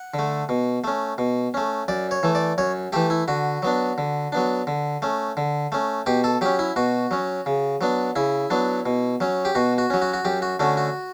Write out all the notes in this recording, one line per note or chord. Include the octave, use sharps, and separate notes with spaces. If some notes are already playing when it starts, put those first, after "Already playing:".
Already playing: F#5
D3
A3
B2
A3 C#4
B2
A3 C#4
F#2 D5
C#5
E3 A3
D5
F#2 C#5
E3 A3 G4
E4
D3 F#4
F#3 B3 D4
D3
F#3 B3 D4
D3
A3 C#4
D3
A3 C#4
B2 G4
A4
F#3 C#4 G4
E4
B2 F#4
F#3 C#4
C#3
F#3 B3 D4
C#3 E4
F#3 B3 D4
B2
F#3 C#4
G4
B2 F#4
F#4
F#3 C#4
F#4
F#4
F#2 G4
F#4
D3 A3 C#4 F#4
F#4